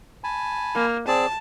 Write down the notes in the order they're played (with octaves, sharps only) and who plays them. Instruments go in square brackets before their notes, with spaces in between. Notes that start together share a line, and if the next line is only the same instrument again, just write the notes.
[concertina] G#5 A5 B5
[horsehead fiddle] A#3
[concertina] C4 G#4 D5 [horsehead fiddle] A5